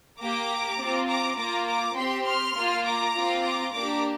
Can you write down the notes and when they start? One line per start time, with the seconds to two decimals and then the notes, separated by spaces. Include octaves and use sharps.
0.20 A#3 G4 A#5 D6
0.80 C4 F4
1.08 A#5 D6
1.38 A#3 F4 A#5 D6
1.67 A#5 D6
1.96 C4 G4 G5 C6
2.26 C6 F6
2.56 A#3 F4
2.85 A#5 D6
3.15 C4 F4
3.44 A#5 D6
3.73 A#3 D4 G4 A#5 D6